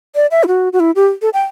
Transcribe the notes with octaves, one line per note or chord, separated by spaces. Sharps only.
D5
E5
E4
F#4
F#4
E4
G4
A4
G5